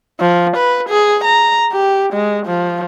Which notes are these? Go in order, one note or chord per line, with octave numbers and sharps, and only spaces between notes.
F3
B4
G#4
A#5
G4
G#3
F3